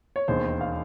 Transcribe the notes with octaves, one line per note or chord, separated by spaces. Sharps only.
C#5
E1 D#2 D#3 C5
F5